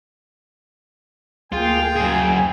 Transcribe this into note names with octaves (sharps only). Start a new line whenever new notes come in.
D2 A#3 F4 G#4 G5
F#2 G#4 G#5